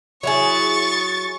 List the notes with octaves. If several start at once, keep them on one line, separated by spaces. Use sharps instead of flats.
F#3 E4 G#4 C#6 A6